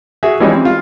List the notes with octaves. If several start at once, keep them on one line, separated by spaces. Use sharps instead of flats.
F#4 G#4 E5
E3 F3 G3 G#3 C#4 D#4
C4
F4